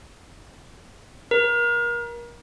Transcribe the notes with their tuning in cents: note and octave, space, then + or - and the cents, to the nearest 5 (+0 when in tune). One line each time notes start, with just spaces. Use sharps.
A#4 +30